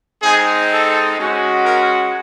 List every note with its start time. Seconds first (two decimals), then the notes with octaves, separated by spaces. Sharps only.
0.22 G#3 C4 D#4 G#4
0.70 A4
1.17 G#3 C#4 F#4
1.65 A#4